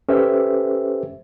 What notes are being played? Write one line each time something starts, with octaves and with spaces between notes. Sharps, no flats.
C#4 G4 A4 B4 C5 E5